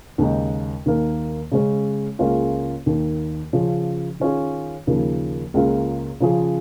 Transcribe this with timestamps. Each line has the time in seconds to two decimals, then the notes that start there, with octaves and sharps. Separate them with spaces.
0.18 D#2 C#3 G#3 D#4
0.86 D#2 D#3 A#3
1.52 C#3 G#3 C#4
2.19 C#2 C#3 A#3 C#4 F4
2.86 D#2 D#3 A#3
3.53 C#3 F3 C#4 F4
4.20 D#3 C#4 F4 G#4
4.87 D#2 C#3 F3 A#3
5.54 C#2 C#3 A#3 F4
6.21 C#3 F3 C#4 F4 G#4